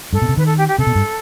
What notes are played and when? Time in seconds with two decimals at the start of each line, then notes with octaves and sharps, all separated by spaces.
0.13 G2 A4
0.22 B2
0.29 C3
0.37 D#3 B4
0.45 A4
0.57 G4
0.67 G4
0.78 C3 A4
0.87 B2
0.95 G2